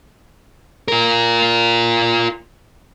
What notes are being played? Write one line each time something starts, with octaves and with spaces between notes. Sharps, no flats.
F4 A#4